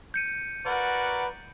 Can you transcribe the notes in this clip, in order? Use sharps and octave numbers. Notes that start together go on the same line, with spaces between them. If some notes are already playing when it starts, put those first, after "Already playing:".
G6 C#7 D#7
F#4 A#4 B4 D5 F#5